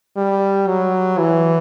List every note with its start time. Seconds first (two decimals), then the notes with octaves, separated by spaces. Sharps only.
0.17 G3
0.67 F#3
1.18 E3